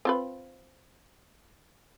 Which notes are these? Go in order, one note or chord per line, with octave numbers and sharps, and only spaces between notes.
C4 F4 B4